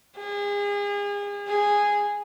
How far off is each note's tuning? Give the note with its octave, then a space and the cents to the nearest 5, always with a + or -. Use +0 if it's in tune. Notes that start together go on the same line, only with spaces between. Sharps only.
G#4 -35
G#4 -10